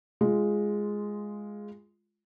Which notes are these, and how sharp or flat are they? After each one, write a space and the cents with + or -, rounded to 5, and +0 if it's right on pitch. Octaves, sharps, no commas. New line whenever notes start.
G#3 +0 F4 -5